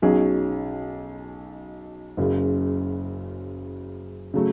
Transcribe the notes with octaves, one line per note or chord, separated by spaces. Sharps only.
B1 B2 F#3 C#4 G#4
F#1 F#2 C#3
C#3 F#3 A3